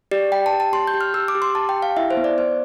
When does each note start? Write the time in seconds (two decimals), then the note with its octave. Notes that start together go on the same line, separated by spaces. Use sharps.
0.11 G4 D5
0.32 G4 G5
0.46 A5
0.52 G4
0.60 A5
0.73 G4 C6
0.87 G6
0.94 G4
1.01 F6
1.14 G4 E6
1.28 D6
1.35 G4
1.42 C6
1.55 G4 A5
1.69 G5
1.76 G4
1.82 F5
1.97 E4 E5
2.10 C5
2.17 B3
2.24 D5
2.38 B3 C5